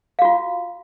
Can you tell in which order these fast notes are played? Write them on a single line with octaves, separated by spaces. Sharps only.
F5 F#4 F4